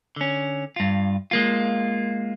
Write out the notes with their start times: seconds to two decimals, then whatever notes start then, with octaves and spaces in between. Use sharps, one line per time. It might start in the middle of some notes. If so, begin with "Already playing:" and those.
0.16 D3 C#4
0.76 G2 F4
1.31 G#3 A#3 F4